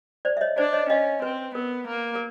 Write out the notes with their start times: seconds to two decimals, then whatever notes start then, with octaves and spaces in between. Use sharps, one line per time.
0.25 C5 D5
0.37 E5
0.41 C#5 D#5
0.58 D4 C5 D5
0.73 C#5 D#5
0.89 C#4 D#5 F5
1.22 C4 B4
1.55 B3 A#4
1.87 A#3
2.15 A#4